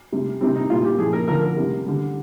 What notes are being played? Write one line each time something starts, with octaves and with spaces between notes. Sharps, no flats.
C3 G3
C3 G3 C4
D#4
A#2 G3 F4
G4
A#2 F3 G#4
A#4
D3 F3 A#4
A#4
C3 G3
D3 G3